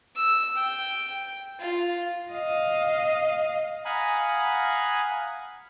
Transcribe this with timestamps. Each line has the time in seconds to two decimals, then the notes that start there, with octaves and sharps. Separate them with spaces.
0.16 E6
0.55 G5
1.59 F4
2.31 D#5 F5
3.85 F5 F#5 G#5 A#5 B5 D#6